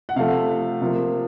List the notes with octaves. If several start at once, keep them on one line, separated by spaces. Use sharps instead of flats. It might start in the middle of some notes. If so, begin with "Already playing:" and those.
F#5
C3 F3 A3 F5
C3 F3 A#3